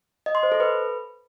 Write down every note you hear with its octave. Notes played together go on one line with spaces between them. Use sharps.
D#5
C6
C5
A4
B4